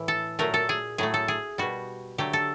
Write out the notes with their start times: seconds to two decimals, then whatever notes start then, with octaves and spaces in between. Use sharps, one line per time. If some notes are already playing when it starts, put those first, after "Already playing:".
Already playing: A2 E3
0.08 A4
0.39 A#2 F#3 A3 A#4
0.54 A4
0.69 G#4
0.98 A2 F#3 A3 G#4
1.14 A4
1.28 G#4
1.58 B2 G3 F#4
2.18 D3 F#3 A3 G4
2.33 A4